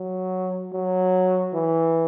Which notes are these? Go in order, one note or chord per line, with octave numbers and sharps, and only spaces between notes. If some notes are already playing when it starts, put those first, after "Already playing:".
Already playing: F#3
F#3
E3